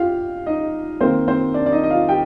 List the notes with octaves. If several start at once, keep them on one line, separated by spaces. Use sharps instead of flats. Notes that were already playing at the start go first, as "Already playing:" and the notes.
Already playing: F4 G4 F5
D#4 D#5
D#3 A#3 C4 C5
C4 C5
D4 D5
D5
D#4 D#5
D#5
F4 F5
G4 G5